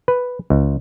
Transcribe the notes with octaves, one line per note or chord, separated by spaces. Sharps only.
B4
C#2